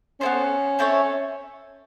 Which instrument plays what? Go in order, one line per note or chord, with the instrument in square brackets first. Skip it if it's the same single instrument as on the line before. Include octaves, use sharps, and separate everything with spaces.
[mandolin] B3 E4 A4 C5 [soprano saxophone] C#4
[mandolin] C4 E4 A4 C#5